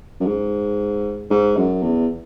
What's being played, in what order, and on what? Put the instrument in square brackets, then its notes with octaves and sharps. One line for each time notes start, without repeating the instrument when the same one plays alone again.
[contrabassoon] F#2
G#2
G#2
F#2
E2